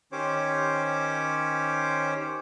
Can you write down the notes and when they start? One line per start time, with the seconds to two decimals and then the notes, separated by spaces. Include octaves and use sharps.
0.12 D#3 C#4 G4 C5 C#5 D6